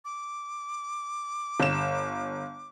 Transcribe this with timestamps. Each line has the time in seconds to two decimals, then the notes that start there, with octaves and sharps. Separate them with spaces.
0.05 D6
1.60 G1 E7